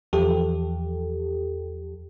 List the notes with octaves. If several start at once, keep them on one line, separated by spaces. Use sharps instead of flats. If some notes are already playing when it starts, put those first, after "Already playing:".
E2 F3 G4 A4